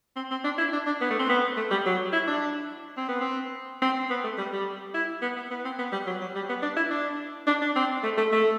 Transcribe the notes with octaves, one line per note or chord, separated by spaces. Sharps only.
C4
C4
D4
E4
D4
D4
B3
A3
C4
B3
A3
G3
F#3
E4
D4
C4
B3
C4
C4
B3
A3
G3
G3
E4
B3
B3
B3
C4
B3
G3
F#3
F#3
G3
B3
D4
E4
D4
D4
D4
C4
A3
A3
A3